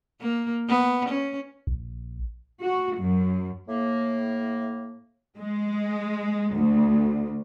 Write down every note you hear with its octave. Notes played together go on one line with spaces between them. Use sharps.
A#3
B3
C#4
A#1
F#4
F#2
A2 A#3
G#3
D2